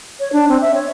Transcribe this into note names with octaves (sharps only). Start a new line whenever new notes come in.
C#5
D4
C4
E5
C#5